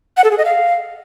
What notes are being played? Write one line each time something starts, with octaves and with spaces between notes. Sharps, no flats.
F#5
A4
G#4
D#5
F5